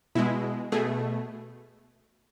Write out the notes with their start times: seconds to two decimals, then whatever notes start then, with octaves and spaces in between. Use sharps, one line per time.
0.15 B2 G#3 E4
0.72 B2 A3 G#4